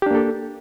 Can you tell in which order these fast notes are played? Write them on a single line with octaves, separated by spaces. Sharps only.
G4 D4 A#3 A4